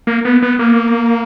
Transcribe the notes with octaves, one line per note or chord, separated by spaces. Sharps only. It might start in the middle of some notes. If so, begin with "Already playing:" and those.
A#3
B3
B3
A#3